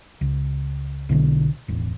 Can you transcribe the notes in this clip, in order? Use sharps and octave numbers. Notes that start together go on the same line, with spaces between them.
C#2
B1 B2 D3
E1 A1